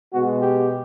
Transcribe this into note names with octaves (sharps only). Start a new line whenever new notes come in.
B2 G#3 B3 F#4
G4